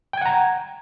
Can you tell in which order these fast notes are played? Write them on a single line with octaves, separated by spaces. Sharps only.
G5 G#6 F#5 A#5